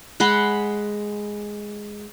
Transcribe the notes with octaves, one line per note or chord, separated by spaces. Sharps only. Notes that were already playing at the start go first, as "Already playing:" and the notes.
G#3 F#5 B5 C6